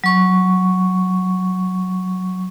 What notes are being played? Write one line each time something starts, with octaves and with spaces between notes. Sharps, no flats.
F#3 C#6